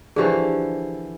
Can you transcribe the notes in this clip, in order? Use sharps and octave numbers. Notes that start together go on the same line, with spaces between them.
D3 E3 F3 G4 G#4